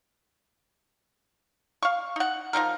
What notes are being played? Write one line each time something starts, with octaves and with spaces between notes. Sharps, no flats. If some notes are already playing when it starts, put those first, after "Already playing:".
F5 C#6
D#4 F#5
F3 G3 D#4 A#4